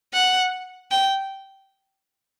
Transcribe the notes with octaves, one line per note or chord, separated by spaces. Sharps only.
F#5
G5